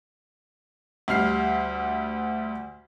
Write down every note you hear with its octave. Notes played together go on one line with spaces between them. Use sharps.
D2 G3 F6 C7